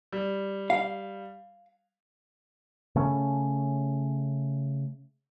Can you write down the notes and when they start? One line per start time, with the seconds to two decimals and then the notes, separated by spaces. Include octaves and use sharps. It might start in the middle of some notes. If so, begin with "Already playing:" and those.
0.13 G3
0.70 F5
2.96 C#3 A3 C#4